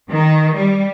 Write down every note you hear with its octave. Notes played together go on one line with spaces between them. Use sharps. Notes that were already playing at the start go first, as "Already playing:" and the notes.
D#3
G3